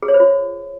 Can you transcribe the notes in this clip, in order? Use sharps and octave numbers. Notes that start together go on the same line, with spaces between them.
G#4
C#5
C5
F4